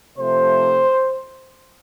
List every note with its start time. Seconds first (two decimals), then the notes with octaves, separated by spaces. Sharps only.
0.17 C3 F3 A3 C5